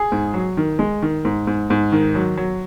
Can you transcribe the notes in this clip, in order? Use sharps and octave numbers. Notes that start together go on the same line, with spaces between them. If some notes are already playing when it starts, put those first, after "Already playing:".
Already playing: G#4
G#2
F#3
D#3
G#3
D#3
G#2
G#2
G#2
D#3
F#3
F#3